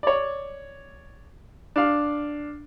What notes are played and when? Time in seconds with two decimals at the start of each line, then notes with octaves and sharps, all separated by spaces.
0.03 C#5 D5
1.76 D4 F5